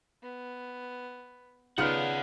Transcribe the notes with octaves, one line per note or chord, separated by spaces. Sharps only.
B3
C#3 B3 D#4 F4 D5 F#5 F6 C#7